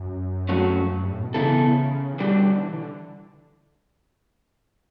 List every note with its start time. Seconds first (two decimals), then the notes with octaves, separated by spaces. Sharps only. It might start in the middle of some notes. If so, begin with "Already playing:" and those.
Already playing: F#2
0.49 F#3 A3 C#4 F#4
0.92 F#2
1.03 G2
1.13 A2
1.23 B2
1.34 C#3 E3 B3 E4 A4
2.14 E3
2.20 B2 D3 G3 D4 G4
2.63 E3
2.74 D3